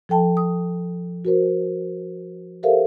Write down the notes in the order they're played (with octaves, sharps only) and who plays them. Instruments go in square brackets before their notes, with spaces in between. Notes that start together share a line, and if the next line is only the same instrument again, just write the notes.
[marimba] F3 A4 G5 A5
D#6
F#4 A#4 C5
G4 A4 A#4 C5 E5 F5